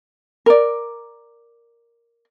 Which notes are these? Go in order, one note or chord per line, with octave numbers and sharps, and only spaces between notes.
A#4 D5